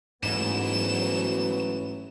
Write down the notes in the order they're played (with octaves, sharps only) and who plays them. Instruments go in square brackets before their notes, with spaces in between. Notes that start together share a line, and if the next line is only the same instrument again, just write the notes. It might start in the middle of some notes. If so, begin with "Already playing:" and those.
[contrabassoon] A1 [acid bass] G#2 [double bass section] F#3 B3 [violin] E7